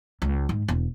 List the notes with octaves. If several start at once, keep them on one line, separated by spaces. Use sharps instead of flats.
C#2
G#2
E1